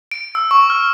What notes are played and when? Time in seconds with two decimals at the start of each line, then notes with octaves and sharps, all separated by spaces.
0.11 D7
0.35 E6
0.51 C#6
0.70 F6